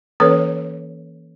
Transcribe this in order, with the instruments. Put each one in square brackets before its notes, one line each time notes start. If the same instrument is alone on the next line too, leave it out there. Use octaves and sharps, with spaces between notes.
[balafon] E3 A#3 C#4 A4 B4 C#5